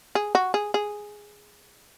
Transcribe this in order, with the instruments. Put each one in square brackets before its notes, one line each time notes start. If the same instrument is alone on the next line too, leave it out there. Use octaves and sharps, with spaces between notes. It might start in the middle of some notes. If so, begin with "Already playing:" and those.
[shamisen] G#4
F#4
G#4
G#4